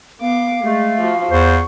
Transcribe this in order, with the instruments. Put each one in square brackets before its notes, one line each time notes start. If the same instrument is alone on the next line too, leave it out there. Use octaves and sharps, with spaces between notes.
[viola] B3 D6 [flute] F5
[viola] G#3 [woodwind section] A3
[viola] F3 F#4
[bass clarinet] E2 [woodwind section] C5 [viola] C#6